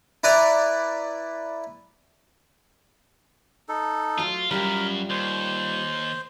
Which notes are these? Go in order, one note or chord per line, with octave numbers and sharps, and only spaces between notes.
E4 B4 D5 A#5
D#4 A4
F#3 A3 F4
F#2 G3 F4 G4 A#4 B5
D#2 C5